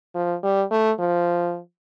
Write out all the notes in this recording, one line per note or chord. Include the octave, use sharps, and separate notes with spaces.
F3
G3
A3
F3